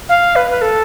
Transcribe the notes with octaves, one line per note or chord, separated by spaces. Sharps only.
F5
B4
B4
A4